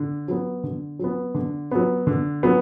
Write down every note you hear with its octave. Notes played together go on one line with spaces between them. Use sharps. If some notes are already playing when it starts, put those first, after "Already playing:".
Already playing: D3
F#3 B3
D3
F#3 B3
D3
F#3 B3
D3
F#3 B3